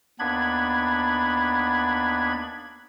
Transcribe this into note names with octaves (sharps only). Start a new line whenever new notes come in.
D#2 B3 D4 B5 G#6